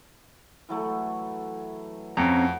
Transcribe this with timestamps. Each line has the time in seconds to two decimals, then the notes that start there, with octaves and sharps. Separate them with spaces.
0.69 E3 F#3 A3
2.17 F2 F#3 C4 C#4 A#5